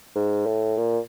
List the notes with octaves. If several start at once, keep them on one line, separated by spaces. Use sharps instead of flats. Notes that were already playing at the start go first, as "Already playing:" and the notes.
G#2
A2
A#2